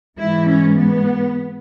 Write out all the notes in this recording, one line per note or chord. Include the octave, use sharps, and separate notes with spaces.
G#2 E3 E4
C#4
B3